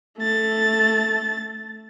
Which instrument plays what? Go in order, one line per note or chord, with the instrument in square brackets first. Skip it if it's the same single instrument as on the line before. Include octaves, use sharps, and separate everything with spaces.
[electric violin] A3 A6